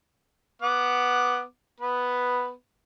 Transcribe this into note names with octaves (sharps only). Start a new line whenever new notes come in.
B3 F#5 D6
B3 B4